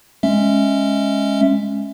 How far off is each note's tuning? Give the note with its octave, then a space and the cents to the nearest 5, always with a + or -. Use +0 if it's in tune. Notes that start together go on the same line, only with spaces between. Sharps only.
G#3 +0 C#4 -10 E5 +0